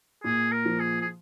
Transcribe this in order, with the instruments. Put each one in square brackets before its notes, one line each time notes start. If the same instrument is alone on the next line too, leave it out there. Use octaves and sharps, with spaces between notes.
[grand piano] A#2 [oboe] G#4
[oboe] A#4
[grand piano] F3
[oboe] G#4
G#4